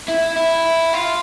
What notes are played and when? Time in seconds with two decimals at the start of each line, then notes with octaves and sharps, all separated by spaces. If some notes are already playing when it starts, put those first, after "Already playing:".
0.09 E4
0.36 E4
0.94 F4